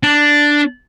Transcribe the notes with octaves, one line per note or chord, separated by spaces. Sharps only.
D4